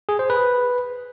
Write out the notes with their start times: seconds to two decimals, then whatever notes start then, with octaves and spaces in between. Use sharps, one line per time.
0.09 G#4
0.19 C5
0.30 B4